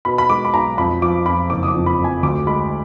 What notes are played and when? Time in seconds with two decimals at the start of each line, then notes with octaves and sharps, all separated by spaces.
0.05 B2 B5
0.18 B5
0.30 G#3 D6
0.45 B5
0.54 B1 A#5
0.78 F2 B5
1.02 F3 D6
1.26 F2 B5
1.50 F#1 D6
1.63 D#6
1.68 D6
1.74 F2
1.86 B5
1.99 F2
2.04 G#5
2.23 D2 D6
2.46 G#3 B5